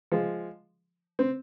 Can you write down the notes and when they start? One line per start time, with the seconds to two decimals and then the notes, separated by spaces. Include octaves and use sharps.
0.12 F3 G#3
1.19 C4